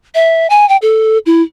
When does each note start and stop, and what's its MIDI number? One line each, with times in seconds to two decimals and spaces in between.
0.15 0.47 76
0.50 0.67 80
0.69 0.77 79
0.82 1.18 69
1.26 1.42 64